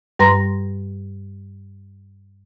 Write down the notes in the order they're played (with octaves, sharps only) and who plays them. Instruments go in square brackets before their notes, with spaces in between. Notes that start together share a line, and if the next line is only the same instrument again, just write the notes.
[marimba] G2 G3 B4 A#5 C6 A#6